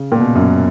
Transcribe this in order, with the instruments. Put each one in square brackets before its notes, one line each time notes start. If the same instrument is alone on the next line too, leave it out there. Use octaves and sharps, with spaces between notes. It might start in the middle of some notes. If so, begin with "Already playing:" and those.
Already playing: [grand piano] C#3
A#2
B2
F#2